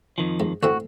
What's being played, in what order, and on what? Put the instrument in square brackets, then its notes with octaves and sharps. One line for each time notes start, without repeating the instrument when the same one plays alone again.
[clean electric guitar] F2 D#3 F3
[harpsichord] G#2
[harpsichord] D2 A2 C4 [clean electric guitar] F#4